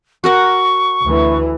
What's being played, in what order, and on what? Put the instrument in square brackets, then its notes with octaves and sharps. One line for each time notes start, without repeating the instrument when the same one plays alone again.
[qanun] F#4 A#4 F#5 [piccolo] C#6
[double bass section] D2 E3